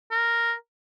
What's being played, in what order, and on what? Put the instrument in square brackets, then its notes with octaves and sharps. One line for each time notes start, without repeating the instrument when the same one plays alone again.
[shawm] A#4